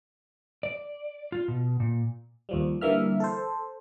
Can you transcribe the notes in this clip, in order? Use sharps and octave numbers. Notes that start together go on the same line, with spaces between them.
D5
F4
B2
A#2
D#2 F3 G3
D3 E3 G3 A#3 E5 F6
A4 C5